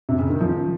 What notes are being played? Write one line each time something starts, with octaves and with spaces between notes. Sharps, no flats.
C3
C#3
D#3
F3